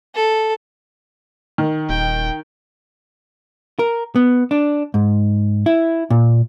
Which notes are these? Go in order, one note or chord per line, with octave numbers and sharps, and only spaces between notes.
A4
D#3
D#1 G5
A#4
B3
D4
G#2
E4
A#2